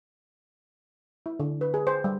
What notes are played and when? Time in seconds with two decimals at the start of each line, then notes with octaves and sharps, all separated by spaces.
1.26 E4
1.40 D3
1.61 B4
1.74 G#4
1.87 C5
2.04 G3